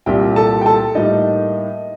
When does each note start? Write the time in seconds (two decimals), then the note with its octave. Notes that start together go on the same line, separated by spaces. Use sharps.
0.06 C2 A#2 G3 G4 G5
0.36 A4 A5
0.61 G5
0.66 A4 A5
0.95 A2 G3 A#3 D#4 D#5